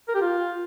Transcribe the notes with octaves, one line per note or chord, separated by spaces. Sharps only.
A#4
G4
F4